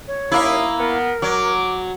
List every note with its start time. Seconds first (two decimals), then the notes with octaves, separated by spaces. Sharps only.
0.07 C#5
0.32 D#2 A#3 E4 E5 D#6
0.78 B3 A#4
1.22 F#3 D6